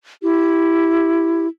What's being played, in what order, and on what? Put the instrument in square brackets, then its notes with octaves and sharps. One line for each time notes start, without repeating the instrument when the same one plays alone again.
[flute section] E4 G4